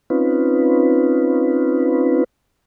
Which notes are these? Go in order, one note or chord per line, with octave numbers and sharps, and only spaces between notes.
C4 C#4 D#4 F4 B4